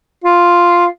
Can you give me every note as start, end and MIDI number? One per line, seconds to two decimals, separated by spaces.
0.24 0.85 65